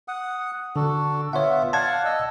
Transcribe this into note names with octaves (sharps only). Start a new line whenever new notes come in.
F#5 D#6
D3 D4 F#4 A4
B3 F4 C#5 E5 F#5
D5 F5 F#5 A5 G#6
D#5 E6